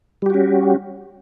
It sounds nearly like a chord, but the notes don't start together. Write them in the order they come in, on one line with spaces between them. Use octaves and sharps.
G3 G4 F#4 C#4